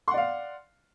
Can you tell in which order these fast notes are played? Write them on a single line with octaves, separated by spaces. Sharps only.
C6 F#5 D5 F5